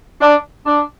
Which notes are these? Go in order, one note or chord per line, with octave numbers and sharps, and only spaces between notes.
D4
D4